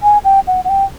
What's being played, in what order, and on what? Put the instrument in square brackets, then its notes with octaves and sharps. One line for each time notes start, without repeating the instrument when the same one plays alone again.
[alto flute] G#5
G5
F#5
F#5
G5